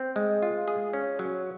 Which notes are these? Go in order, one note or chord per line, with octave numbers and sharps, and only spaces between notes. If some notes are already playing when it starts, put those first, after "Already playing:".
Already playing: C4
G#3
F4
G#4
C#4
F#3